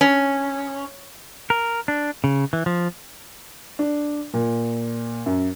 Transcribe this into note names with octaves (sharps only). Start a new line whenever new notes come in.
C#4
A#4
D4
C#3
E3
F3
D4
A#2
F#2